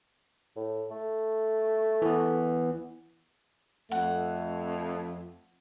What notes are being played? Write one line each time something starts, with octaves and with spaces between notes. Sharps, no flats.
A2
A3
E3 B3
F2 A3 F#5